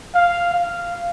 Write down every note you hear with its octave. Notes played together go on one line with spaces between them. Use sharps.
F5
F5